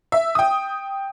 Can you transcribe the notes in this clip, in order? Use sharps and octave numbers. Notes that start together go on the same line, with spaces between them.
E5
G5 D#6